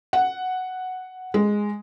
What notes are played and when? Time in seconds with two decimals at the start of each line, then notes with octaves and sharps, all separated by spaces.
0.13 F#5
1.34 G#3